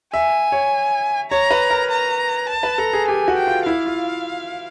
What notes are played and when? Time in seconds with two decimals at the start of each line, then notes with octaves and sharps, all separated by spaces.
0.14 E5 G#5
0.52 C#5
1.31 C#5 A#5
1.51 B4
1.70 A#4
1.90 A#5
2.49 A5
2.63 B4
2.78 A4 A#5
2.93 G#4
3.08 G4 G#5
3.28 F#4
3.37 G5
3.47 F4
3.66 E4 F5
3.86 F4